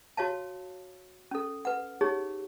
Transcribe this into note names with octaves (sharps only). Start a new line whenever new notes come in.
F#4 C#5 F5 A5
C#4 A4
B4 F#5
D#4 G4 G#4 C#5